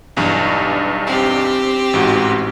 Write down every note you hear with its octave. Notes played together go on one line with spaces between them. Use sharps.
B1 E2 G2
C4 G4
A1 G#2 F#4